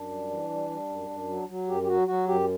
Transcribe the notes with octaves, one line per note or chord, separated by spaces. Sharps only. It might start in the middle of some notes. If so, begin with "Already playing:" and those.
Already playing: F#2 D4
G3
E3
G3
G3
F#2
F#2
F#3
F#3
F#2 G4
G4
F#3 F#4
F#3 F#4
F#2 G4